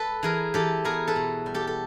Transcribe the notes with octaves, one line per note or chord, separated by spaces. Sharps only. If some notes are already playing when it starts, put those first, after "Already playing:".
Already playing: A4 B4
E3 G#4 A#4
E3 G4 A4
B3 G#4 A#4
A4 B4
B2
G3
G4 A4
A4